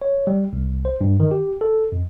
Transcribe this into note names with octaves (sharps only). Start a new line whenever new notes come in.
C#5
G3
C2
C5
G2
D#3
G4
A4
F2